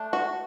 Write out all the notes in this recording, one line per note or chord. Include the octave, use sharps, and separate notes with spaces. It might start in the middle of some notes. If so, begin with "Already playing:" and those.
Already playing: A3 D4
F#4